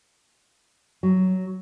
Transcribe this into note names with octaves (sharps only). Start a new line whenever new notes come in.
F#3